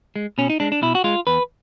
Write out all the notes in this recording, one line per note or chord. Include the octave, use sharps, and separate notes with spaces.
G#3
B2 C#4
D#4
G#3 D4
D4
B2 E4
F#4
G#3 F4
E2 B4